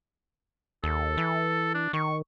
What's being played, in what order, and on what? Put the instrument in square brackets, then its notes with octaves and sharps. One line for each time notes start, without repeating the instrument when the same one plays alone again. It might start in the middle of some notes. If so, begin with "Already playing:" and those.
[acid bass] D#2 [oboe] A4
[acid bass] E3
[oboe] D4
[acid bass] D#3 [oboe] C#6